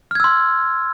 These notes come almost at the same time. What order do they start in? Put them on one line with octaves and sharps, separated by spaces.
F6 G#6 E6 C6